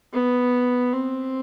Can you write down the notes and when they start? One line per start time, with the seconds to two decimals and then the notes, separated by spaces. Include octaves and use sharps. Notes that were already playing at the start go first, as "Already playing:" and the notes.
0.13 B3
0.93 C4